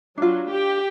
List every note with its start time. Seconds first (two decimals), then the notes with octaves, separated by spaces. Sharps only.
0.18 F#3 D4 F4
0.49 G4